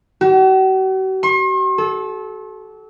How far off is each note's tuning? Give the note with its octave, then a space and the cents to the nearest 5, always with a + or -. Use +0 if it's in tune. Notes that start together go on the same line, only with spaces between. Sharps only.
F#4 +45
C6 +45
A4 -25